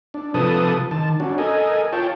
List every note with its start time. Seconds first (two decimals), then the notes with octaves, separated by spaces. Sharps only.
0.14 D4
0.34 C3 F3 A4 B4 A5 D#6
0.91 D#3 A5
1.20 C#4 D4 F#4
1.38 A4 A#4 D#5 G#5
1.93 F4 C#5 G5 A5